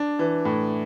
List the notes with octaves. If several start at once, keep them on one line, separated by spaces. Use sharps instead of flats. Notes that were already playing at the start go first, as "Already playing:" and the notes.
Already playing: D4
E3
A2